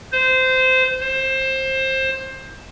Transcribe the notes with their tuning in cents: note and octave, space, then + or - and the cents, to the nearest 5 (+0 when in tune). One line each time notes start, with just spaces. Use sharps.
C5 -20
C5 +20